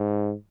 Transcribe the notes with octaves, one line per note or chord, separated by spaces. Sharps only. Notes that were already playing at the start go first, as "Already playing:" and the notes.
Already playing: G#2